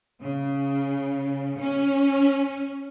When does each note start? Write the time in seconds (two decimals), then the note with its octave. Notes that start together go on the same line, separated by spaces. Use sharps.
0.23 C#3
1.58 C#4